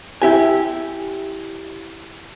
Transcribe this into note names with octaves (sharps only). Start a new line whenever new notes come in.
E4 G4 G#5